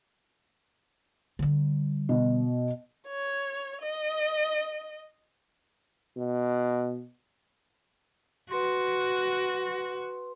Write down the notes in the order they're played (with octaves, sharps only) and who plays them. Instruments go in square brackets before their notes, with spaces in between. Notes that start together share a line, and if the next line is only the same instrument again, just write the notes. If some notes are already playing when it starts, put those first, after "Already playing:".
[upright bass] D3 G3
[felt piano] B2
[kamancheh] C#5
D#5
[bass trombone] B2
[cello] F#4 [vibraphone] B4 C6